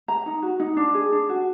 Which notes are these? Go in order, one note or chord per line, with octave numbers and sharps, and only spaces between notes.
A#5
D#4
F#4
D#4
D4
G#4
D4
F#4